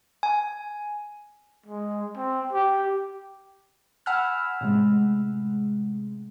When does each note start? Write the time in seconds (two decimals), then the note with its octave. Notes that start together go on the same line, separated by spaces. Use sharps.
0.23 G#5
1.66 G#3
2.17 C4
2.53 G4
4.06 F#5 G#5 B5 E6 F6
4.61 A2 C3 G#3